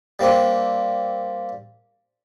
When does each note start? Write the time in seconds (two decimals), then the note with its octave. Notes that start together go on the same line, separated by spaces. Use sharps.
0.19 G3 A#3 C4 D4